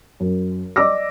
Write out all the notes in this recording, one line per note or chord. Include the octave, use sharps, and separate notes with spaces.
F#2
D5 D#5 D6 E6 A#6